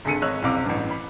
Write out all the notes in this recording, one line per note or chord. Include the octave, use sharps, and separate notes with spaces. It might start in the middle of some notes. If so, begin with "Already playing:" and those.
G#1 D3 G#4 A4 C#7 D#7
G#1 C#5 D#5 E6 F#6
F#1 C2 C3 F5 D6
A1 G2
B5